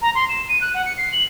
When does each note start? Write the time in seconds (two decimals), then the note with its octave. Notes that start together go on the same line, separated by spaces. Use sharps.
0.02 A#5
0.15 C6
0.29 E7
0.49 D#7
0.61 F#6
0.74 F#5
0.85 C#7
0.98 C7
1.12 F#7